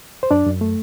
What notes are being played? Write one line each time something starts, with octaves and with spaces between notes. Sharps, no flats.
C5
F#2 D4 D5
F#2
A3